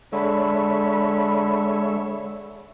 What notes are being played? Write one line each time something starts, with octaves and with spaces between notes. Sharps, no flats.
D3 G#3 C#5 E5 B5